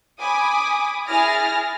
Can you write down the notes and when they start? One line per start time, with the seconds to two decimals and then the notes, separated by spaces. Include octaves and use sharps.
0.20 G#5 B5 D6 D#6
1.08 E4 G#4 G#5 F6 A6 A#6